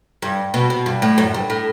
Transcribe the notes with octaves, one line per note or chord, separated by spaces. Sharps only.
G2
B2
B2
G2
A2
F#2
G2
A2